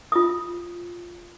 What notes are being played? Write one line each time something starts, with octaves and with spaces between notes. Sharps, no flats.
F4 D#6